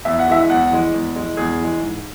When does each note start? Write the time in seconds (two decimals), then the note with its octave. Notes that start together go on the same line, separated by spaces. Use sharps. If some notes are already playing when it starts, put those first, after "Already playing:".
0.05 E2 E5
0.19 F#5
0.28 E3 G#3 E5
0.50 E2 F#5
0.71 E3 G#3
0.94 E2
1.16 E3 G#3
1.37 E2 G#4
1.60 E3 G#3
1.81 G#2